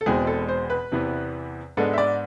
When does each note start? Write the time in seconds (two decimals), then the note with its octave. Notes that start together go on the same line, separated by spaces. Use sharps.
0.01 A4
0.06 E1 E2 B2 G#3 C4 G#4
0.27 A4
0.49 C5
0.70 B4
0.92 E2 C3 E3 B3
1.77 G#2 G#3 B3 D4 A4
1.93 E5
1.98 D5